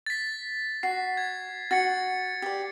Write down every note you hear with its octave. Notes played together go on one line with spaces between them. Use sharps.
A6 B6
F#4 C7
G#6
F#4 A6 C#7
G4 D5